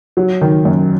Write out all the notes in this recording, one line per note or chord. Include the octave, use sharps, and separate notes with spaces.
F#3
D#3
F#2